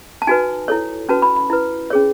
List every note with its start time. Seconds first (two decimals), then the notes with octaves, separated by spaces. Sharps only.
0.22 A5
0.27 D#4 F#4 B4 G#5
0.68 E4 A4 C#5
1.09 C#4 F#4 B4 A5
1.22 B5
1.36 B5
1.50 E4 B4
1.90 C#4 G#4 C#5